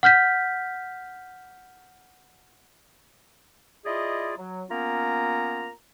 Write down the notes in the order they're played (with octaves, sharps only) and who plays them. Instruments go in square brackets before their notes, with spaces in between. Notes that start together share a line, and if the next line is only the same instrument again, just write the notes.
[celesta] F#5 F6 G6 B6
[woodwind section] E4 F4 G#4 D5 D#5
F#3
A#3 B3 C#4 F4 A#5